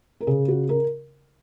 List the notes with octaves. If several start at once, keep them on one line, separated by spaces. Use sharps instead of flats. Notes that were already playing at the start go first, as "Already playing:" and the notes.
A#4
C#3 G#4
F#4
A#4